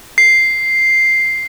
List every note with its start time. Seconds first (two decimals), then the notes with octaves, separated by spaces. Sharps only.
0.18 C7